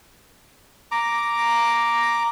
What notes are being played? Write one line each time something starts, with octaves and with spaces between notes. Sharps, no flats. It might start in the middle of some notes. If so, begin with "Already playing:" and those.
A#5 D6